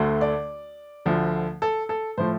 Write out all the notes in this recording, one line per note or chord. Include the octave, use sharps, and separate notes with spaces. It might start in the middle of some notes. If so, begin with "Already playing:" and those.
Already playing: D2 D3 A3
D5
D2 D3 F3
A4
A4
A2 F3 A3 C5